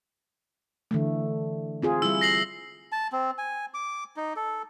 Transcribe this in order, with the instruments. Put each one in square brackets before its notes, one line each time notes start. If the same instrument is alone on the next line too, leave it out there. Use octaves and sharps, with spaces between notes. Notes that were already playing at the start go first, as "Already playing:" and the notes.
[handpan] D3 E3 A3
C4 F4 G#4
[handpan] G3 E4 [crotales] E6
[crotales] A#6 C7 F#7
[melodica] A5
C4
G#5
D6
D#4
A4